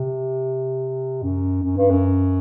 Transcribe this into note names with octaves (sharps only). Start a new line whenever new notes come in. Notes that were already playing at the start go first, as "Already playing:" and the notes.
Already playing: C3
F#2
F#2
G2
F#2